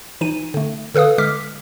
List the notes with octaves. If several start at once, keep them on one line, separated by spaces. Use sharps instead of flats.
E3 D#4 D#7
D3 A3
D3 A4 B4 F5 D#6
D3 G#3 D6 F6 B6